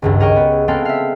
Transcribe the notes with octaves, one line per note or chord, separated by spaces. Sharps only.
G#1 C#2 G2
G#4 A#4 C#5 D#5 G5 C#6
B3
G#3 B3 C4 A4 F5 G5
E5 F5